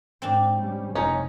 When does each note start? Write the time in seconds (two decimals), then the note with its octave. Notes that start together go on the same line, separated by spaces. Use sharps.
0.22 G#2 C4 D4
0.57 G3 C#4
0.95 F1 C#4 D#4 C#5